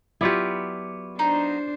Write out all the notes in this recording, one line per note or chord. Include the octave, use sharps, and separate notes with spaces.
F#3 B3 E4 F4 G4 D5
D4 D#4 C5